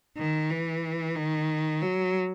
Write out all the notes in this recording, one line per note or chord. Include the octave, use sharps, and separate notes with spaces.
D#3
E3
D#3
F#3